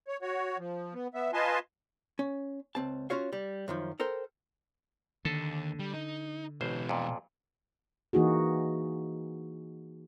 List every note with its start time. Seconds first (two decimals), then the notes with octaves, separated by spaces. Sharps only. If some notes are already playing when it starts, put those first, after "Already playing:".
0.08 C#5
0.22 F#4 C#5
0.58 F3
0.94 B3
1.14 B3 E5
1.33 F4 B4 D#5 G#5 A5 C6
2.19 C#4
2.75 C#2 C4 A5
3.10 C#4 F4 F#4 C#5 F5
3.33 G3
3.68 F#2 D#3 F3
4.00 A4 A#4 C5 G5
5.25 D#2 D3 A4
5.79 G3
5.94 D#4
6.61 A1 B2 E3 C5
6.89 F2 A#2
8.13 E3 A#3 D#4 F#4 G#4